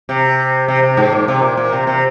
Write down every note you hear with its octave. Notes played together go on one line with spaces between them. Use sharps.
C3
C3
C3
G#2
A#2
C3
A#2
A#2
C3
C3